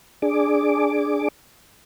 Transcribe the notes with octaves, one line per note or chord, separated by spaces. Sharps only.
D4 G#4 D6